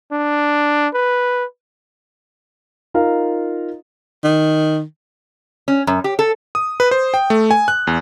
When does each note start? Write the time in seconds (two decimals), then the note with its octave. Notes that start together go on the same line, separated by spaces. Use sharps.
0.12 D4
0.94 B4
2.94 D#4 F4 A#4 F5
4.24 D#3
5.68 C#4
5.87 F#2
6.04 G4
6.19 A4
6.55 D#6
6.80 B4
6.91 C5
7.14 G5
7.30 A3
7.51 G#5
7.68 F#6
7.87 E2